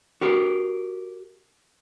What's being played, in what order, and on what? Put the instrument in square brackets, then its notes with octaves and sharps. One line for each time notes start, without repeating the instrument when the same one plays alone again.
[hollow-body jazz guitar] F#4 G4 A#4